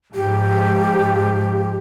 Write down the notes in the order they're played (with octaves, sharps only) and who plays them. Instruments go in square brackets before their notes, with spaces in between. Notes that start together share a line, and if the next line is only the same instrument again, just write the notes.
[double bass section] G#2 F3 [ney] G4